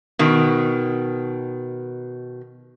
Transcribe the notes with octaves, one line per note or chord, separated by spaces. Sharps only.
B2 D#3